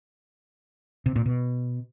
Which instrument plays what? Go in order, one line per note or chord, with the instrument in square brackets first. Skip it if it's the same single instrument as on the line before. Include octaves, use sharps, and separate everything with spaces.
[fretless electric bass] C3
A#2
B2